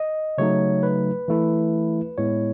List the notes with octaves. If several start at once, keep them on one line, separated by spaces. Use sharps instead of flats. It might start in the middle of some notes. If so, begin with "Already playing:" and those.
Already playing: D#5
C#3 F#3 A3 D#4 C#5
B4
E3 A3 E4
A2 G#3 B3 E4 C#5